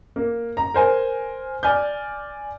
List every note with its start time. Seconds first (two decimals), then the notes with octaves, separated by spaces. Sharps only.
0.16 A#3
0.57 A#5
0.74 A#4 C5 G#5
1.63 D5 G#5 F6 G6